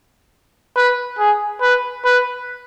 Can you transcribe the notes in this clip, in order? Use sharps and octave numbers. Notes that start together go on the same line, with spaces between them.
B4
G#4
B4
B4